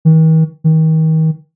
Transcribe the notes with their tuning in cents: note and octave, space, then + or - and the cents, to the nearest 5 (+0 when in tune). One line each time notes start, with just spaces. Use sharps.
D#3 +45
D#3 +35